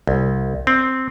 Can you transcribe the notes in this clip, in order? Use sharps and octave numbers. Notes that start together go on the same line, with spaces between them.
C2
C4